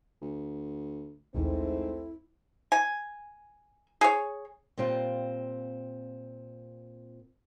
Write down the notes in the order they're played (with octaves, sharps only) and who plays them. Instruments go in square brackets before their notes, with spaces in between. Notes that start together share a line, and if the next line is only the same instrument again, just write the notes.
[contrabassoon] D2
[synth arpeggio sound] A#1 D#2 [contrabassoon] G#2 [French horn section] A3 C4 [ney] E4
[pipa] G#5
G#4 C#5
[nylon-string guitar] A#2 G3 C4 F4 G5